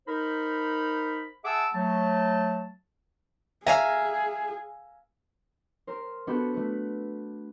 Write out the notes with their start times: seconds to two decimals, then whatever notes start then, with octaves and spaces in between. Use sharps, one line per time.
0.08 D#4 A#4 C5 B5
1.44 G#4 E5 F#5 A5 D6 E6
1.74 F#3 A3 A5
3.66 G#4 E5 F5 G#5 A#5
5.87 A#4 C5
6.27 B3 D4 F#4 A4 B5 G6
6.54 A3 B4